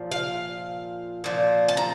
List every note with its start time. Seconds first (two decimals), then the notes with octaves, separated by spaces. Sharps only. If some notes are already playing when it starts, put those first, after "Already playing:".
Already playing: A#2 F3
0.12 F5
1.24 A#2 F3
1.68 A5
1.77 A#5